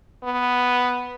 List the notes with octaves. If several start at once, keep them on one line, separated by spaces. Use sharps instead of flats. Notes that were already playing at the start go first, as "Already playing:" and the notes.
B3